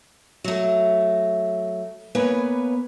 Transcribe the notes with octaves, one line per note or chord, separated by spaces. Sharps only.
F#3 A3
A#3 B3 B4 C#5 G#5